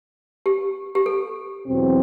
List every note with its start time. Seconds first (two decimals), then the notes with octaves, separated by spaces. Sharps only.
0.46 G4
0.95 G4
1.06 A4
1.66 E2 B2 F#3 C4